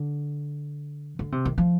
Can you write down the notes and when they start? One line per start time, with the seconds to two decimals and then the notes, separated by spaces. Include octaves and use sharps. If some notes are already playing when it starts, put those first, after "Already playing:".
Already playing: D3
1.19 D3
1.32 C3
1.45 D#3
1.58 F3